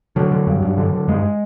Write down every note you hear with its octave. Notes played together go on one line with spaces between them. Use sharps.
D3 F#3
D3
G2
G2
D3
D3
G2 G#3